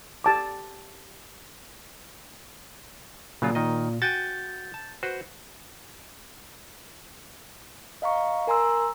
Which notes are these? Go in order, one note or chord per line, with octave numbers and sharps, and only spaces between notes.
G4 A5 D6
A#2 C#3 F#3 F4
D#3 D#5
F#4 G5 G#5 G6 A6
A5
F#4 B4 C5
D#5 F5 A#5 C#6
A#4 G#5 A#5 C6 E6